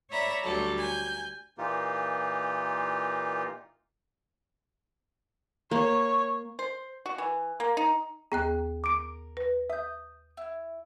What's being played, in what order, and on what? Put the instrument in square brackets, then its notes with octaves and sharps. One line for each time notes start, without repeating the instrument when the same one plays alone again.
[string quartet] C#5 D5 E5 A#5 B5
D2 F#3 G3 A4
G#5 G6
[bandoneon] A#2 E3 A#3 D#4 F4 G4
[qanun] A#3 [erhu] C#5
[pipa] C5
F#4
E3
A#3
D#4
[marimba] D#2 B3 [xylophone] G#4 G5 F#6 [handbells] A#5
[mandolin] A#4 [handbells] D6 D7
[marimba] B4
[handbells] E5 [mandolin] D#6 G6
[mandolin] E4